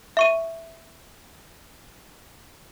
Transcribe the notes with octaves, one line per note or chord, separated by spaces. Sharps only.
E5 C#6 D#7